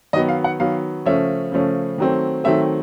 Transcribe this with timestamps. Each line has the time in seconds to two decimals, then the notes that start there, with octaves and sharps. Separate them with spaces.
0.13 D#3 F#3 B3 D#5
0.29 F5
0.44 F#5
0.60 D#3 F#3 B3 F5
1.06 C#3 F3 A3 C#4 E5
1.52 C#3 F3 A3 C#4
1.98 D#3 F#3 A3 C4
2.44 D#3 F#3 A3 C4 E5